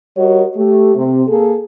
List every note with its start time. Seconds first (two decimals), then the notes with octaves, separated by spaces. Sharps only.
0.17 G3 F#4 A#4 C#5 D#5
0.56 A3 G4
0.95 C3 C4
1.28 A#3 G#4 A4